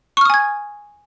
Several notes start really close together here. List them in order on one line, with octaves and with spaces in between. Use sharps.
C#6 F6 D#6 G#5 G#6